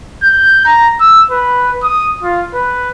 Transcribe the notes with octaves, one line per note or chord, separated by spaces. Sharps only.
G6
A#5
E6
B4
D#6
F4
B4